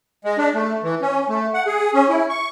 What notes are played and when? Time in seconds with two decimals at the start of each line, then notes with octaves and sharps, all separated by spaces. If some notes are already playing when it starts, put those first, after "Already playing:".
0.24 G#3
0.38 D4
0.55 A3
0.83 E3
1.01 C#4
1.29 A3
1.54 F#5
1.67 G#4
1.94 C#4
2.09 E4
2.29 C#6